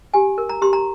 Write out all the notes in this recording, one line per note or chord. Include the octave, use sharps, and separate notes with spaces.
G4 G#5
A#4
A#5
G4 C6
A#5